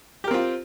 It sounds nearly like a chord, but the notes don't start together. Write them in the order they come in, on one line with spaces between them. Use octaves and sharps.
G4 A#4 C4 F4